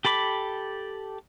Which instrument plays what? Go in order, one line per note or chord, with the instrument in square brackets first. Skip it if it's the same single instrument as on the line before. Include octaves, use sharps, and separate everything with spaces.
[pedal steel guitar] G4 A4 B5 D6